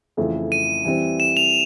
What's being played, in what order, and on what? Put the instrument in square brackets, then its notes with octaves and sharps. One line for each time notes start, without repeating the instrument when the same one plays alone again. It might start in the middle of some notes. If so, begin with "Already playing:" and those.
[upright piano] F2 C#3 E3 A3
[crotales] D#7
[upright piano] E3 G3 C4
[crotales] E7
F7